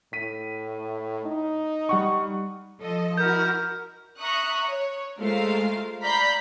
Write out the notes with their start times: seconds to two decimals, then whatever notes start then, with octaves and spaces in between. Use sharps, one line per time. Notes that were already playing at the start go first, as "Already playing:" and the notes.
0.13 A2 B6 D#7
1.25 D#4
1.89 G3 F#5 C#6
2.81 F3 A4 D#5
3.18 E4 F#4 A#4 G6
4.19 E5 A#5 C#6 D#6 F#6
4.68 C#5
5.18 G#3 A3 F4 A#4 C5 F5
6.01 D5 F5 A#5 B5 G6 B6